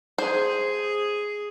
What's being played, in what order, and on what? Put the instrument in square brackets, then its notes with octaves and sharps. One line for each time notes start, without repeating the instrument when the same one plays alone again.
[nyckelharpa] G#4 [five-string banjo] C5